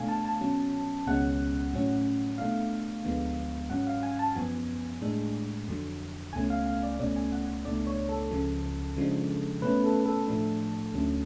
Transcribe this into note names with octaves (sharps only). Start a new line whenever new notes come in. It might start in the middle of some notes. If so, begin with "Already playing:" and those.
Already playing: B2 A3 D4 F5 G#5
A5
A5
B2 F#3 C#4
C#2 B2 G#3 C#4 F#5
A2 F#3 C#4
B2 A3 D4 F5
D2 D3 F3 G#3 B3
G#2 F#3 C#4 F#5
F5
G#5
A5
F#2 F3 B3 G#5
A2 G#3 D4
F2 D3 F#3
C#2 B2 A3 C#4 G#5
F5
F5
D5
C#2 B2 A3 C#4 D5
G#5
F#5
C#2 B2 A3 D4 D5
C#5
A4
C#2 C#3 F3
C#3 F3 G#3 D4
B2 A3 C#4 B4
A4
A4
A2 F3 A3 D4
D2 D3 F#3 A3 C#4